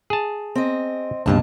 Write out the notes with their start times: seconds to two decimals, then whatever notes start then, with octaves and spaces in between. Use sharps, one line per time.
0.10 G#4 A5
0.55 C4 D#5
1.26 C#2 G2 B2 A#3 A5